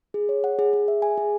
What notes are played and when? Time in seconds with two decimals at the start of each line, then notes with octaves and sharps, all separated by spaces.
0.14 G#4
0.29 C#5
0.44 F#5
0.59 G#4
0.73 G#4
0.88 E5
1.02 G#5
1.18 G#4